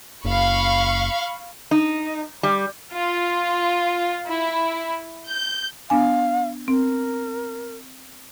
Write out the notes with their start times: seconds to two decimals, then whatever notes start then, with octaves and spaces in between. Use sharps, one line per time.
0.25 F#1 F5 B5 C#6
1.71 D#4
2.43 G3
2.93 F4
4.27 E4
5.28 G6
5.90 B3 D4 F5 G#5
6.68 C4 A#4